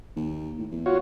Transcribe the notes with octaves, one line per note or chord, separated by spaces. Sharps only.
D#2
A2
E2
F4 F#4 C#5